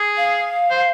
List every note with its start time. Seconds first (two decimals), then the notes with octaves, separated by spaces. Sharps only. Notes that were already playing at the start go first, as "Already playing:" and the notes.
Already playing: G#4
0.17 F5
0.71 C5